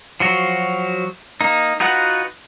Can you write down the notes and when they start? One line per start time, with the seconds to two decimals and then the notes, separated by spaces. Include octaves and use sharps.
0.20 F3 F#3 F#4
1.41 A#3 D#4
1.80 D#4 F4 F#4 B4 F#5